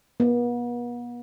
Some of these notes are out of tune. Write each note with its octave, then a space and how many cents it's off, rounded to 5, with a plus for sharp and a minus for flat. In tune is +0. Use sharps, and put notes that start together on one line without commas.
B3 -40